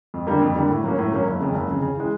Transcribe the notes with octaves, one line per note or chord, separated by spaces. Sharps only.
F2
D3 G3 A#3
F2
D3 G3 A#3
A2
F#3 A#3 C#4
A2
F#3 A#3 C#4
F#1
F2 C#3
F#1
F2 C#3
C#3
E3 G#3